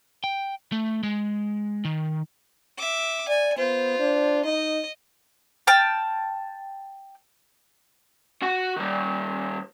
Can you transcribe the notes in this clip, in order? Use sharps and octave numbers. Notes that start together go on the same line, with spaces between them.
G5
A3
G#3
D#3
E5 D6
D5 G#5
B3 F4 C5
D4
D#4 D#5
G5 A5 F6
F#4 F#5
D#3 G3